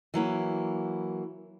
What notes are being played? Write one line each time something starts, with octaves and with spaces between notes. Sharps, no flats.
E3 F#3 A#3 E4